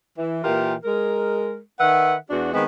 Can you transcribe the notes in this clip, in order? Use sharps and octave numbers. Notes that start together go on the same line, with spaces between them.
E3
A#2 E3 F4 G4 A#4
G#3 A#4
D#3 B4 E5 F#5
E2 D4 F#4
D#3 G#3 B3 C4 G#4